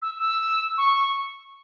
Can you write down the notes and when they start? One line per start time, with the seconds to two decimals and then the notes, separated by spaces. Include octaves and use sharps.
0.01 E6
0.18 E6
0.77 C#6